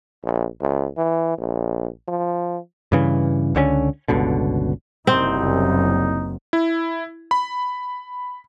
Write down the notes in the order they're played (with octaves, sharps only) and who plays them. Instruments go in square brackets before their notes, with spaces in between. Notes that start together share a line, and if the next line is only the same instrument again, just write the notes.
[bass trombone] A#1
C#2
E3
A#1
F3
[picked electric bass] G2 C#3 E3
C#2 D3 G#3 C#4
G1 C#2 B2 D3
[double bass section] F#1 F#2 [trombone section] C2 [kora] C4 [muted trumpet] D#4
[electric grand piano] E4
B5